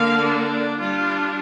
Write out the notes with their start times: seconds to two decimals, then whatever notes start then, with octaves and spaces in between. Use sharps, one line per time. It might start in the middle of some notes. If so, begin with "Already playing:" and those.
Already playing: D3 A#3 F5
0.25 D4
0.78 G3 D4 F4